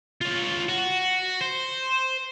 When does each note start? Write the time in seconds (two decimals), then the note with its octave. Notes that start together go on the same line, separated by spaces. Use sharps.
0.21 F4 C#5
0.69 F#4
1.41 C5